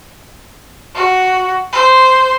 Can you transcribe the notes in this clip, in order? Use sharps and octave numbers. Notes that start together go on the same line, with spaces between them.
F#4
C5